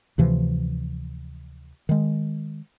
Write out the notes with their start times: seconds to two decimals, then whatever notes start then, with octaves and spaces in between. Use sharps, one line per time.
0.18 D2 C3 E3 F3
1.89 D#3 G#3